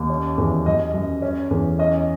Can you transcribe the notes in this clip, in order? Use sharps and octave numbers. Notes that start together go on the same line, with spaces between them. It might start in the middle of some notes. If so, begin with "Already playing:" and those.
Already playing: D#2
C#4
E2
F#2 D#5
F#2
C#4
E2
C#4 D#5